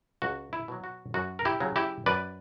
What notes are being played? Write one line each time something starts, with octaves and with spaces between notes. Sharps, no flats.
C#2 F#4
E4
B2 F#3
F#4
F#2 F#4
A#4
E4 G4
C#3 F#3
E4 G4
F#2 B4 D5